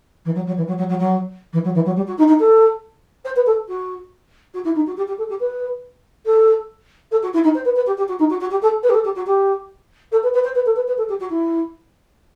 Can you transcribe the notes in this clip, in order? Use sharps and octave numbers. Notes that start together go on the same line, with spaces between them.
E3
F#3
F#3
E3
F#3
F#3
F#3
F#3
E3
F#3
E3
F#3
G3
F#4
D#4
D#4
A4
C5
B4
A4
F#4
F#4
E4
D#4
F#4
G4
G4
A4
G4
B4
A4
A4
F#4
E4
D#4
C5
B4
B4
G4
G4
F#4
D#4
F#4
F#4
G4
A4
B4
G4
A4
G4
F#4
G4
A4
B4
B4
C5
B4
A4
B4
B4
A4
G4
F#4
E4